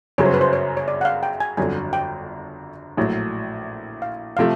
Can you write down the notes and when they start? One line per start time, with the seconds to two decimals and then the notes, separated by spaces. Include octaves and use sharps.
0.18 G1 F#2 C#3 F#3 C#5
0.25 C5
0.34 B4
0.41 C5
0.53 C#5
0.77 C#5
0.88 D5
1.01 F#5
1.05 F5
1.23 G5
1.40 G#5
1.57 G1 F2 D3 F#3 G#5
1.93 G5
2.97 A#1 A2 F#3
4.02 F5
4.37 C3 F3 A3 F5